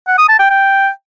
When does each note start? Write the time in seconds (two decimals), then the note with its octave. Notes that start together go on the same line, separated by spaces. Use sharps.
0.08 F#5
0.18 D#6
0.29 A5
0.39 G5
0.50 G5